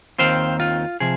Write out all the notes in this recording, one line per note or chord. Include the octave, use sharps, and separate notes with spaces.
D#2 D#3 C4 F4 C5 F5
F4
C3 F3 G#4